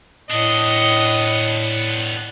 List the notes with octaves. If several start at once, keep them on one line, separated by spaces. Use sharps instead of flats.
A2 B3 D4 D#5